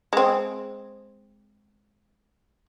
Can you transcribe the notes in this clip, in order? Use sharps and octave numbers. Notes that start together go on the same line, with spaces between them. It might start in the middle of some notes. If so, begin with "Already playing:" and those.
G#3 C4